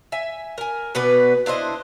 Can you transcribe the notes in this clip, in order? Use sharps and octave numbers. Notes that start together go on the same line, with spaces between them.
E5 G#5
A#4 G#5
B2 B3 B4 D5
D4 E4 C5 D#5